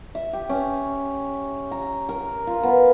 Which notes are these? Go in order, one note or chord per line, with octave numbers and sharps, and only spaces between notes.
E5
G4
C#4
A#5
A#4
F4
B3